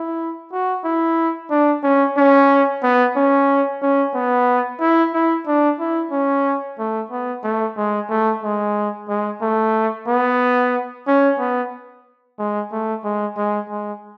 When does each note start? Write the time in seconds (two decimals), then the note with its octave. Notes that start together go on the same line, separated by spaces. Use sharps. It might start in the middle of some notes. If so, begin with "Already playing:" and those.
Already playing: E4
0.52 F#4
0.84 E4
1.50 D4
1.83 C#4
2.17 C#4
2.83 B3
3.15 C#4
3.82 C#4
4.14 B3
4.80 E4
5.14 E4
5.47 D4
5.79 E4
6.11 C#4
6.78 A3
7.11 B3
7.43 A3
7.76 G#3
8.09 A3
8.43 G#3
9.09 G#3
9.42 A3
10.08 B3
11.07 C#4
11.39 B3
12.39 G#3
12.71 A3
13.04 G#3
13.37 G#3
13.69 G#3